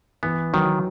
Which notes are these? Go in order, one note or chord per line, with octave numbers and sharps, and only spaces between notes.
E3 B3
D#3 F#3